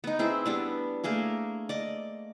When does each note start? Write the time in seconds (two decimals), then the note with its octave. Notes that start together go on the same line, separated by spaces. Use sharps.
0.04 B3 D#4
0.19 C4 E4 G#4
0.46 G3 B3 D4
1.04 A3 A#3 G#4 A#4
1.69 D5 D#5